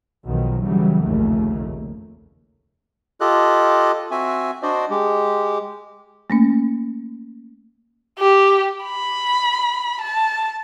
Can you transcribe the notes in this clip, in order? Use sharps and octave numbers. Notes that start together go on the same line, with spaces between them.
B1 B2 D#3 F3
C#3 E3 F#3 G3
F1 A#1 D#2 C#3 A3 A#3
F4 G4 A4 D#5 F#6
C4 F#4 E5 G#5
D4 F#4 C5 D5 D#5
G#3 G4
A3 A#3 C#4
G4
B5
A5